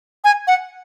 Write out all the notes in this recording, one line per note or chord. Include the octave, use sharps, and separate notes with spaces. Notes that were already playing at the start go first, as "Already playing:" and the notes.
G#5
F#5